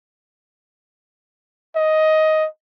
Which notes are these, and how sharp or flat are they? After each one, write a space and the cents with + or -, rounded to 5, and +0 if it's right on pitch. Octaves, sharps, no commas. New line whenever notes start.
D#5 +10